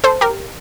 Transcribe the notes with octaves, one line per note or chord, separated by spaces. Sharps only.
A4 C5
G4 A#4